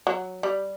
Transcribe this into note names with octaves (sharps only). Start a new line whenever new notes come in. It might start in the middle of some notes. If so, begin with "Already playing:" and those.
F#3
G3